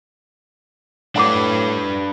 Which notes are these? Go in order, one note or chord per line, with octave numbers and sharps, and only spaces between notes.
A2 D4 B4 F#5 B5 D6